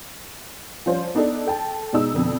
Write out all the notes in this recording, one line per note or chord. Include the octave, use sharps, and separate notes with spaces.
F3 G3 C#4 F4 C5
B3 D4 D#4 A4
A4 G5 A5
B2 G#3 D#4 E6
F2 B2 D3